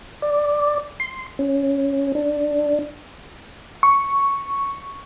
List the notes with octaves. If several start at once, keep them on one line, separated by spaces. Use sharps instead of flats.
D5
C6
C#4
D4
C#6